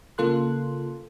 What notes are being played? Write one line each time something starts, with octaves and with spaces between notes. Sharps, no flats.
C#3 A#3 F4 A4 C6 F#6